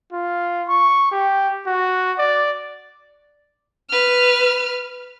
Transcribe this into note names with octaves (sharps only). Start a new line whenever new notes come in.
F4
C#6
G4
F#4
D5
B4 F6